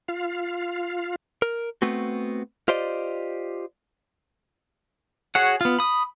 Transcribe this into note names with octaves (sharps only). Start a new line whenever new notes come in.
F4 F5
A#4
A3 B3 C4 F#4
F4 G4 C5 D5 D#5
F#4 G#4 C#5 F#5
B3 F4
B5 D#6